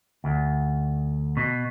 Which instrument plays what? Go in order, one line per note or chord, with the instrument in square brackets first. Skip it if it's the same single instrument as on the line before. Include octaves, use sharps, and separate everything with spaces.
[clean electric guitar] D2
B2